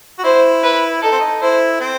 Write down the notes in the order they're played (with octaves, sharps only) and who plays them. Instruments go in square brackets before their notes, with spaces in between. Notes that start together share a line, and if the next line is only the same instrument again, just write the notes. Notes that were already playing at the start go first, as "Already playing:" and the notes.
[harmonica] F#4
[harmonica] E4 [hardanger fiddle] C5
[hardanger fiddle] B4
[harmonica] D#4 [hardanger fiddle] A4
[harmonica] C4
D#4
[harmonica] E4 [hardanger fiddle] C5
[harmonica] C4